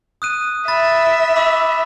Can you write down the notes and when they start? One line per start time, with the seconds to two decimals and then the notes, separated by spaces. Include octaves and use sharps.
0.22 D#6 F#6 D#7
0.68 E5 B5 A6
1.36 B5 D6 E6